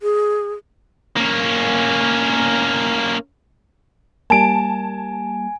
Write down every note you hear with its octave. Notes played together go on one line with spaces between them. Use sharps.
G#4
A#3 C#4
G3 A#3 G#5 A5 D7